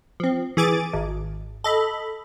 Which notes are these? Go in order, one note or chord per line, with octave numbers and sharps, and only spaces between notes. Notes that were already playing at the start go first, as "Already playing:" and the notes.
F3 C4
E3 G#4 G#5 D6 A6 D7
G#1
A4 D#5 B5